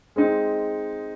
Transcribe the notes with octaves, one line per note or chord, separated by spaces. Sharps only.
G#3 C4 D#4